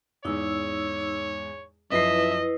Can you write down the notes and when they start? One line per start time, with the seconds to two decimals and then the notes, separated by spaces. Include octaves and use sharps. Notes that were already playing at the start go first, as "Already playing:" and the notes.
0.25 E2 G#2 D#4 C#5 E6
1.92 F#2 F3 E4 B4 D#5 E5 C7